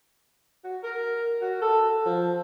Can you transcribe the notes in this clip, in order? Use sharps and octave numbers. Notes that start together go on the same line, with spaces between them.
F#4
A#4
F#4
A4
F3